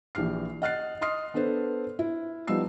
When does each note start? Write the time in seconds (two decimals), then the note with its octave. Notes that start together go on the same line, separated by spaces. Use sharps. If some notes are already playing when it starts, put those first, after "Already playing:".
0.15 A#1 E3 G4 F6 C7
0.62 D#5 F#5 F6 F#6 A6 C7
1.01 D#5 C6 D#6 F6 C7
1.34 B3 D4 A4 B4 C5
1.99 E4
2.47 F3 G3 B3 D#4 E6 C7